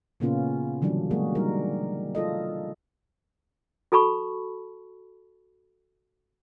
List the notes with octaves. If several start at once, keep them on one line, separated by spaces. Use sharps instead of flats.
A#2 C#3 A#3 B3 C#4 F4
D3 E3 F#3 G3 D4
F#3 G#3 A#3 F#4 G#4
G3 D#4 A#4
F4 A4 D#5
F#4 A4 A5 B5 C#6